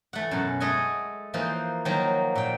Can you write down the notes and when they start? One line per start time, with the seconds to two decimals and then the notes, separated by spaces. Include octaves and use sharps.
0.13 E3 A3 F#5
0.31 F#2 B2
0.60 G#3 A3 A4 D#5 F#5 G#5
1.34 E3 F3 A#3 D#4 F4 C5
1.85 D#3 F3 F#3 A#3
2.35 A#2 G5